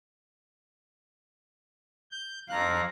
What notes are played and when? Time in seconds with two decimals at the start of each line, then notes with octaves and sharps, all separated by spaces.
2.11 G6
2.49 F2 F5 A#5 F#6